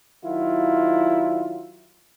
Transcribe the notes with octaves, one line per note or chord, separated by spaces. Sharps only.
D#3 F#3 E4 F4